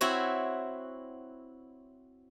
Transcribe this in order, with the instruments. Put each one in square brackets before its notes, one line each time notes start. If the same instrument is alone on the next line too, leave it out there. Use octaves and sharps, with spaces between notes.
[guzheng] C4 E4 F#4 C#5 B5